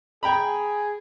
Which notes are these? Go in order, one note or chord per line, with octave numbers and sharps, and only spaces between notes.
G#4 G5 A#5 B5